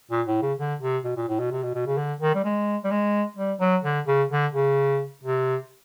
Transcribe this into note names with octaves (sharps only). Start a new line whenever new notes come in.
A#2
A2
C#3
D3
C3
B2
A#2
A2
B2
C3
B2
B2
C#3
D3
D#3
G3
G#3
G3
G#3
G3
F#3
D3
C#3
D3
C#3
C3